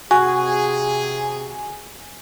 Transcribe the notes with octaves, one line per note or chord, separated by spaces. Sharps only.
C3 F#4 G#4 G#5